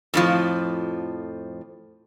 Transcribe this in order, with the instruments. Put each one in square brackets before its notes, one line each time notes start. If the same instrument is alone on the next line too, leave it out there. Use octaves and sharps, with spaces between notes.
[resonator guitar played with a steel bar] F2 A2 F3